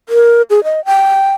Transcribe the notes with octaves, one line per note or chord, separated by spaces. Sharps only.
A#4
G#4
D#5
G5